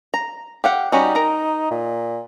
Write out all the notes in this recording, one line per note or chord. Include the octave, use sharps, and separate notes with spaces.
A#5
G4 F5 F#5
G3 C#4 D#4 F#4
A#4 A#5
A#2